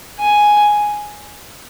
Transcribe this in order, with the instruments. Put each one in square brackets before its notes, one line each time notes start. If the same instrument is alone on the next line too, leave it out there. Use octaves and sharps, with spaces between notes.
[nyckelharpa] G#5